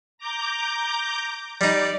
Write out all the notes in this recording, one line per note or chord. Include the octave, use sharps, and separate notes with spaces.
A#5 D6 G6
G3 D#4 D5